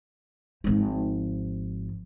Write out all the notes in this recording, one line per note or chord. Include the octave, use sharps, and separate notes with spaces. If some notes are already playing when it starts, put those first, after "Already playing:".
G#1 F3